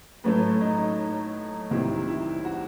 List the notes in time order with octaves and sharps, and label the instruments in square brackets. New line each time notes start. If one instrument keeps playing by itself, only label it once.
[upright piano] A2 F#3 A3 B4
D#4
D#4
C2 C3 D#3 E4
E4
F#4